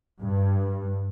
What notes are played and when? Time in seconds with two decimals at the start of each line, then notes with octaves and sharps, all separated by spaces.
0.22 G2